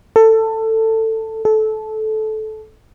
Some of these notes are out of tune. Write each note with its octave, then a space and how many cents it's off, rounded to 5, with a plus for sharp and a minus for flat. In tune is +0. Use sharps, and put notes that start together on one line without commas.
A4 +15
A4 -20